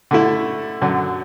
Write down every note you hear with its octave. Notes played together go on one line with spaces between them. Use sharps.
D3 A3 E4
F#2 D3 F#3